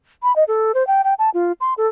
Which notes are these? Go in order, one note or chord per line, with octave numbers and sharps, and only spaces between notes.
B5
D#5
A4
C5
G5
G5
A5
F4
C6
A4